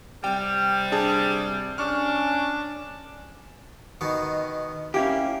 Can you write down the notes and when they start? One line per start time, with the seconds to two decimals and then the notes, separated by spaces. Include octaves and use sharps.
0.24 C3 G3 G5
0.92 D4 G#4 A5
1.78 C#4 D4 C#6 F6
4.01 B2 D#3 B3
4.94 A#3 C#4 E4 G4